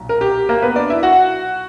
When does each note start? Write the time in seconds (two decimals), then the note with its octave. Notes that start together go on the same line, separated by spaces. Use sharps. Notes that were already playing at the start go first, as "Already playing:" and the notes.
Already playing: B1 A#2 F#3
0.09 A#4
0.21 G4
0.49 A#3 A#4
0.62 B3 B4
0.76 D4 D5
0.90 E4 E5
1.03 F#4 F#5